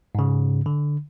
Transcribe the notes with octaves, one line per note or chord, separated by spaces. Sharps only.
G#2 C#3
D3